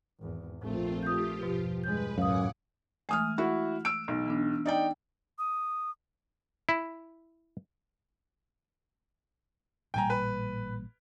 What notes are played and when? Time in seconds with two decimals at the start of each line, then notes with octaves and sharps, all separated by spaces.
0.20 G#1 E2
0.61 A#1 A3 C4 F4
1.03 F4 G4 D#6 G6
1.41 E2 G2 B2 F3
1.84 G2 G#3 B4 G6
2.18 C#2 F#2 A2 F5 F#5 G#5 D6 D#6
3.09 E3 G#3 A3 G#5 D#6 F6
3.38 E4 F#4 G#4 F#5
3.85 E6 D7
4.08 B1
4.26 E3 B3 D4
4.66 D#4 D5 G5
5.39 D#6
6.69 E4
9.94 A1 A#2 G3 G5 G#5 A#5
10.10 B4